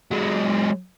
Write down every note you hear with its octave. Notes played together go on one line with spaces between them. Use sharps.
F#3 G#3